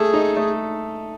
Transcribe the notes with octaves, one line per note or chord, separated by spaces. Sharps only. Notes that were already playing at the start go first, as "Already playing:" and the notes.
Already playing: A3 G#4 A4
D#4
A3